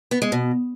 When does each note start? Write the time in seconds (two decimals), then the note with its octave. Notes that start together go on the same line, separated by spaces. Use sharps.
0.11 B3
0.22 G#3
0.32 B2